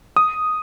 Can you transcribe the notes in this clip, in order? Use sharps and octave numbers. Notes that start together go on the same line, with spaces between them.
D#6